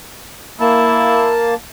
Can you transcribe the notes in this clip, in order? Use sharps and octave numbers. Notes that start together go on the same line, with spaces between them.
A#3 E4 A5